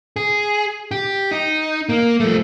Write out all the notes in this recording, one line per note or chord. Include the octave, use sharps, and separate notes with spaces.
G#4
G4
D#4
A#3
F3 A3